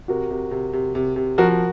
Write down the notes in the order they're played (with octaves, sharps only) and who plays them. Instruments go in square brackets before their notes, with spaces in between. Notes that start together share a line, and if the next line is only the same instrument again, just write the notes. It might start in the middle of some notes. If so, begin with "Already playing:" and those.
[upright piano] C3 [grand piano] F#4 A#4
[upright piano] C3
C3
C3
C3
C3
[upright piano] F3 [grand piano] F#4 A#4